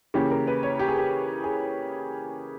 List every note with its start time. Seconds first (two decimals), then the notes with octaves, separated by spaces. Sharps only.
0.14 C#3 E3 A#3 C#4 G4
0.31 A#4
0.47 B4
0.63 C#5
0.79 G4
0.88 G#4
0.97 G4
1.44 G#4